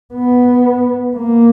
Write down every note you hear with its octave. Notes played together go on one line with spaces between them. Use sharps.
B3
A#3